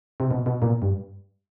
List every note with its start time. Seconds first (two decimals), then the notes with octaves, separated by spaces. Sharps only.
0.20 C3
0.31 B2
0.46 B2
0.62 A#2
0.82 G2